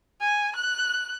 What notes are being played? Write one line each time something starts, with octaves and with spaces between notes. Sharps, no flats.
G#5
F#6